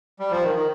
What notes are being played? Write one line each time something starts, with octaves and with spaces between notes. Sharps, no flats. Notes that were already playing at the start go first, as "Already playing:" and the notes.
G3
F3
D#3
D#3